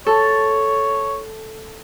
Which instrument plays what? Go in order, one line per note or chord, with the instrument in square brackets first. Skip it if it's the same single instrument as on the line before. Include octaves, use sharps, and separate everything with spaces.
[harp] A4 [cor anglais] C#5